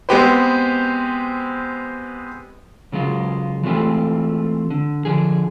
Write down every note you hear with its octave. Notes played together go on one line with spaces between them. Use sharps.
G#3 B3 C4 G4 B4 C5
C#3 F#3 G#3 F4
E3 G#3 A3 C4 F4 G4
D3
D3 F3 G#4